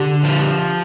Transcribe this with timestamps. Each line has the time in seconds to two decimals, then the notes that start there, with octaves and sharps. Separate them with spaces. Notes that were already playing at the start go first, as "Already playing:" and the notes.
Already playing: D3 G4
0.23 F3